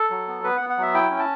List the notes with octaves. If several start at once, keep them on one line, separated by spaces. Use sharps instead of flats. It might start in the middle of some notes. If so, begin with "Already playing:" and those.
Already playing: A4
F#3
B3
B3 B4
B3 F#5
F#5
F#3 E5
E4 G5
C#4
A5